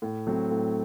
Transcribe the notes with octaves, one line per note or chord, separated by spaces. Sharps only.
A2
F#3 A3 C4
A2